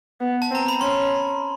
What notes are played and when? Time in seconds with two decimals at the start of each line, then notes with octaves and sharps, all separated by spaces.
0.21 B3
0.42 A5
0.50 C4
0.55 A#5
0.68 B5
0.81 C#4 C6